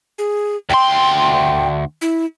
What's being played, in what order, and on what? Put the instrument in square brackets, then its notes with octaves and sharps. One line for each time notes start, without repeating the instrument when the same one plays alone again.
[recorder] G#4
[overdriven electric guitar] D2 C6 [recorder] G5
[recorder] E4